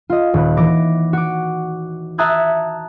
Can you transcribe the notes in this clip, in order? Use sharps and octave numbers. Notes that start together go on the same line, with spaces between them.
F4 D#5
D#1 B4
E3 D6 A#6
F#4 D6
E5 A5 A#5 D#6 F#6 G#6